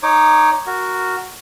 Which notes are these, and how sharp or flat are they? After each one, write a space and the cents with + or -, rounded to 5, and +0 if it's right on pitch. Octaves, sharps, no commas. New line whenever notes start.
D#4 +0 C#5 +0 D6 +25
F#4 +0 A#4 +0